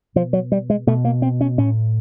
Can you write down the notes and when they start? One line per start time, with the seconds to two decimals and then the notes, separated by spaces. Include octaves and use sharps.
0.15 B2 F3
0.33 F#3
0.52 G3
0.70 G#3
0.87 B2 A3
1.05 A#3
1.22 C4
1.41 C#4
1.57 A2 C#4